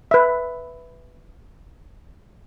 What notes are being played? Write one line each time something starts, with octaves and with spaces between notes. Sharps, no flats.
B4 E5